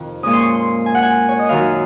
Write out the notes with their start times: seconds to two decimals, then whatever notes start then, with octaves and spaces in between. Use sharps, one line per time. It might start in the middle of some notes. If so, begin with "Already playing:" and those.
Already playing: F2 C3 D#3
0.23 A#2 G#3 C#4 D#6
0.33 C6
0.39 C#6
0.55 C6
0.86 G#5
0.95 F#5
1.03 G#5
1.29 C#5
1.39 D#5
1.49 F#2 D#3 F#3 F5